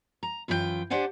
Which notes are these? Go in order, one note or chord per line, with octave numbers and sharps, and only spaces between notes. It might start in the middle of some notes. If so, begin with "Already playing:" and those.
A#5
F#2 E3 F4 F#4 G5
D4 G4 C5 D5 F#5 G#5